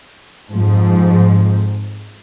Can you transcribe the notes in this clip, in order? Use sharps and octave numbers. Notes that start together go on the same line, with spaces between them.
F2 G#2 F3